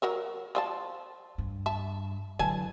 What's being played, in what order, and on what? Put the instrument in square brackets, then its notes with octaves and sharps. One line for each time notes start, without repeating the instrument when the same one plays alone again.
[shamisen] F#3 A#4 E5
F3 E5 A5
[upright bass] G2
[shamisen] E5 A5
[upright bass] D3 F#3 [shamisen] E3 G#5 A5